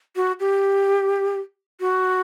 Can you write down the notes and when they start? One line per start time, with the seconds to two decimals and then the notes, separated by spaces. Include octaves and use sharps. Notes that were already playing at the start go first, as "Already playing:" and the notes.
0.16 F#4
0.40 G4
1.81 F#4